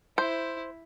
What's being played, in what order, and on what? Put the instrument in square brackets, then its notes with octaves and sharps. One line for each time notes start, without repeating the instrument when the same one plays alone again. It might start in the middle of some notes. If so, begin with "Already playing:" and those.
[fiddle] E4 [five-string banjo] C5